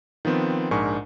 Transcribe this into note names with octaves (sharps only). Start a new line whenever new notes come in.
D#3 F3 B3 C4
A#1 G#2 D4 A#4 G#5 C#6